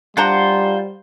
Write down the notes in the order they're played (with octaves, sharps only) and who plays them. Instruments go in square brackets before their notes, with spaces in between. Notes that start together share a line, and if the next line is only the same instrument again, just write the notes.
[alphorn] G3 [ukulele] D4 F#5 A#5 [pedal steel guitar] F4 C5